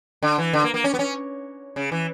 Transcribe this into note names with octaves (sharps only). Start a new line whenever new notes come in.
D3
E3
D3
A#3
A#3
C#4
B3
C#4
C#3
E3